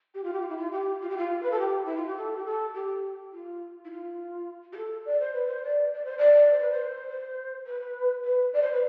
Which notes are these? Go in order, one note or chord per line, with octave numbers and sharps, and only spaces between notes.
G4
F4
G4
F4
E4
F4
G4
F4
G4
F4
B4
A4
G4
E4
F4
G4
A4
G4
A4
G4
F4
E4
F4
G4
A4
D5
C5
B4
C5
D5
D5
C5
D5
C5
B4
C5
C5
B4
B4
D5
C5
B4